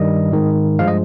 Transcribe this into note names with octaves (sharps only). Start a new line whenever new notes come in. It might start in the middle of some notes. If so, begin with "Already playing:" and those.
Already playing: G2 D#3 G3 D#5
G#2 D#3 G#3
G2 F3 G#3 F5
D#5